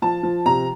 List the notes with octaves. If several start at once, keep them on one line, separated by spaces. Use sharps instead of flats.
F3 A5
F3
C3 A#5